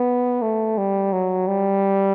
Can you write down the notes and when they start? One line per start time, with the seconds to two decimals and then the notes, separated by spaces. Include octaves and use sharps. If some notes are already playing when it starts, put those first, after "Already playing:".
Already playing: B3
0.42 A3
0.78 G3
1.13 F#3
1.48 G3